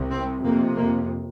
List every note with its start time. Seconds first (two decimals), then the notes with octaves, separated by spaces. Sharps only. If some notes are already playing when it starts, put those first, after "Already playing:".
Already playing: C2 C3
0.10 C4
0.43 F2 C3 A#3
0.76 A#3